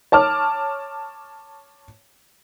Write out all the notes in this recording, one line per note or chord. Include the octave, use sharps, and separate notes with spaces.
C#5 A5 D6 F6